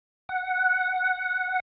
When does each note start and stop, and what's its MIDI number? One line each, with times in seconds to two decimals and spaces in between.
0.29 1.60 78